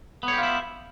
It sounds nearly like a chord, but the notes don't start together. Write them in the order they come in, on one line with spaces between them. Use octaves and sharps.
B3 C#5 G4 F4 E4